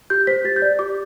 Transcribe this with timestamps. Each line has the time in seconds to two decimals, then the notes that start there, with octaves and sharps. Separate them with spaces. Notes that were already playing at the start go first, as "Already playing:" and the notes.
0.10 G4 G6
0.27 C5 B6
0.44 G4 A6
0.56 G6
0.62 D5
0.79 G4 D6